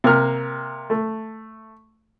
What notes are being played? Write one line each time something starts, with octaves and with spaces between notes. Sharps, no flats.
C3 A#3 F6
A3